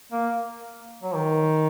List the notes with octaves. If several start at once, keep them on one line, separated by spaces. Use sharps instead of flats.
A#3
F#3
D#3